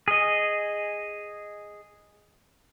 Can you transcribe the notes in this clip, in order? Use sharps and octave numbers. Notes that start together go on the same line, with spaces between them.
G#4 D#5